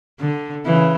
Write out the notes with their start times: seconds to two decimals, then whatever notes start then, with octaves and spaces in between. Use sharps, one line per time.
0.20 D3
0.66 C#3 E3